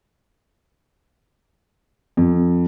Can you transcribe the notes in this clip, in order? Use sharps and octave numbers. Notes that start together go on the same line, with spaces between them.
F2